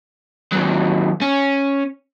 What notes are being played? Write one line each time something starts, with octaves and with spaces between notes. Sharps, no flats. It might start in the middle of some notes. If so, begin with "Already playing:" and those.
D#2 F#3
C#4